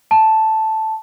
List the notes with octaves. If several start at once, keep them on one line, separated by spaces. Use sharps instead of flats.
A5